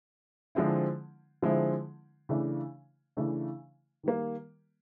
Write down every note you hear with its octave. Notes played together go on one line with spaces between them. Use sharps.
D3 F3 G#3 C4 E4
D3 F3 G#3 C4 E4
C#3 E3 A3 D4
C#3 E3 A3 D4
D#3 G3 A#3